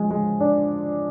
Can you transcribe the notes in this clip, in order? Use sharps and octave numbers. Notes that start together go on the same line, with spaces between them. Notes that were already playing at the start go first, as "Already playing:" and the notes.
Already playing: F3 G#3
G#3
D4